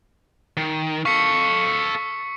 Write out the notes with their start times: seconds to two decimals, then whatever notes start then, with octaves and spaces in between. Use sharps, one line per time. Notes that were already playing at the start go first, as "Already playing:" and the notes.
0.57 D#3
1.05 A4 F5 C#6 B6 C#7